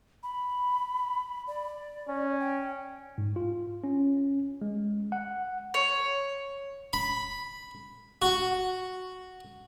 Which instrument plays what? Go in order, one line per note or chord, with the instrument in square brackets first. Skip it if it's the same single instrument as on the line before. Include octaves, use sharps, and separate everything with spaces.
[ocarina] B5
D5
[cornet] C#4
[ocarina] G5
[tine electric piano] G#2
F4
C#4
G#3
F#5
[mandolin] C#5
[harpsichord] B5
F#4